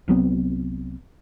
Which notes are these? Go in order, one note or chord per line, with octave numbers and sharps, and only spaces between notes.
C2 F#3 B3 C4